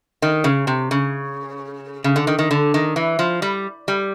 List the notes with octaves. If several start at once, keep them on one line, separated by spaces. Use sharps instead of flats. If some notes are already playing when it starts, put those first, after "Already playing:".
D#3
C#3
C3
C#3
C#3
D3
D#3
D#3
D3
D#3
E3
F3
G3
G3